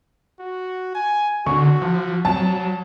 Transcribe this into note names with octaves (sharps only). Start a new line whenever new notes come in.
F#4
G#5
D3 F#4 C#6
F3
F#3 A5